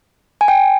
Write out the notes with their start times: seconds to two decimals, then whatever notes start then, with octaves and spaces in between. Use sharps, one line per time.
0.41 G#5
0.48 G5